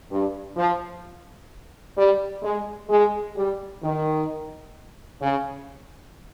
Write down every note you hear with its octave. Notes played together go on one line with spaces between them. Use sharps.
G2
F3
G3
G#3
G#3
G3
D#3
C#3